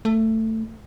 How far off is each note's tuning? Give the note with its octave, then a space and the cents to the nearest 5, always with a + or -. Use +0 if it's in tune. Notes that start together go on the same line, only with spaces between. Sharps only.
A3 +15